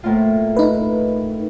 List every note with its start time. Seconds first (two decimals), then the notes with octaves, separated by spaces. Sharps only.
0.03 A2 A#3 F4
0.57 D#4 B4